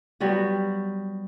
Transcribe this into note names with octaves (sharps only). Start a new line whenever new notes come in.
F#3 G3 B3 F#4